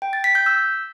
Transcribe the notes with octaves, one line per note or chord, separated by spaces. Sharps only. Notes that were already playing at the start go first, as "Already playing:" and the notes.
G5
A6
B6
G6
E6